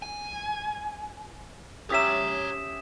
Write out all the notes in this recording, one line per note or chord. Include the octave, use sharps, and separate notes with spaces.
G#5
C#4 G4 C#5 E5 A#5 D#6 B6 E7